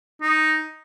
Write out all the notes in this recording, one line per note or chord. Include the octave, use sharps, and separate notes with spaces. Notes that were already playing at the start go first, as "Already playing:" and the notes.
D#4